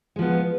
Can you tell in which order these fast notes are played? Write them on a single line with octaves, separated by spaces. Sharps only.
G#3 F3 B3